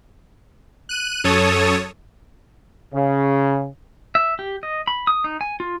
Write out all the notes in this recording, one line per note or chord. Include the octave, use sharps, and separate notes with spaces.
F#6 D#7
F#2 A4 C#5 A5 D#6
C#3
E5
G4
D#5
B5
D#6
D#4
G#5
F4